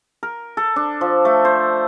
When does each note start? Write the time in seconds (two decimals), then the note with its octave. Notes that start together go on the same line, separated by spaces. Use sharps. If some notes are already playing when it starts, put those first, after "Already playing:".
0.23 A#4
0.57 A4
0.76 D4
1.01 F3
1.25 A3
1.45 C5